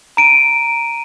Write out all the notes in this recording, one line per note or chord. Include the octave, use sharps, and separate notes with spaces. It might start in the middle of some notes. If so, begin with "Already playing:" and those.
A#5 D7 D#7